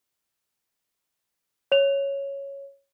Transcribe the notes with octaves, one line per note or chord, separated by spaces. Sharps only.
C#5 F7